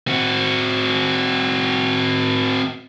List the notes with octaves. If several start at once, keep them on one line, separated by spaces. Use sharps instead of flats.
C4 F#4